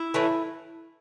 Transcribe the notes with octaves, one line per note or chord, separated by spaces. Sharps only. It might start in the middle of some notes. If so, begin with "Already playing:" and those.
Already playing: E4
A2 E3 A3